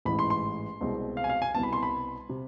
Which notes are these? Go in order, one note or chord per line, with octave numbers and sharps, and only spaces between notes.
A1 G#2 E3 B5
C6
C6
C2 B2 G#3 C4
F5
G#5
F5
G#5
C2 B2 B3 A5
B5
C6
B5
C3